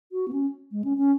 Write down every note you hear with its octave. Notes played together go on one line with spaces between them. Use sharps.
F#4
B3
C#4
G#3
C#4
C#4